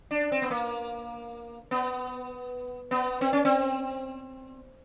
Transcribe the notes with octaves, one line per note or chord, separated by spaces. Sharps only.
D4
C4
B3
A#3
B3
B3
C4
C#4
C4